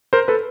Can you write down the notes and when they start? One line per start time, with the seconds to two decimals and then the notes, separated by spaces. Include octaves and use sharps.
0.13 A#4 C5
0.28 A4 B4